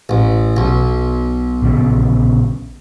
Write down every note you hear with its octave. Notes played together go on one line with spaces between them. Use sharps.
A1
B1
A#1 C#3 B3